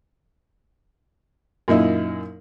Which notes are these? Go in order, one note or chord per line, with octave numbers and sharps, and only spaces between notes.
F#2 A#2 D#4 E4